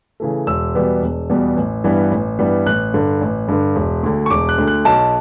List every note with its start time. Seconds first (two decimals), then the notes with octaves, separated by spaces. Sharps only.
0.20 C#3 E3 A3
0.47 E1 E6
0.75 E2 B2 G3 B3
1.02 E1
1.30 E2 B2 G3 B3
1.56 A1
1.84 G2 E3 G3 B3
2.11 A1
2.39 G2 E3 G3 B3
2.66 A1 F#6
2.94 G2 D3
3.21 A1
3.48 G2 D3
3.76 E1
4.03 D2 D3
4.26 C#6
4.30 E1 D6
4.49 F#6
4.58 D2 D3
4.67 F#6
4.85 B1 A5